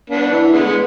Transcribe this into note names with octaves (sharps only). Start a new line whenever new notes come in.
B3 D4
E3
D3 G#3 B3
G#3